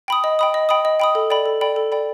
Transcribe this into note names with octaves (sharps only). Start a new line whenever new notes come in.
G5 B5 D#6
D#5
G5 B5 D#6
D#5
G5 B5 D#6
D#5
G5 B5 D#6
A4
D5 G5 B5
A4
D5 G5 B5
A4
D5 G5 B5